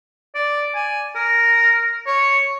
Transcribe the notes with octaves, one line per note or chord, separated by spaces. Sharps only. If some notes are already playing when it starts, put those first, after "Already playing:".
D5
G#5
A#4
C#5